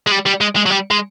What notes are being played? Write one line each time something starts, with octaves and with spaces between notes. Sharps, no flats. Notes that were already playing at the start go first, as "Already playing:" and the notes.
G#3
G3
G3
G#3
G#3
F#3
G3
G#3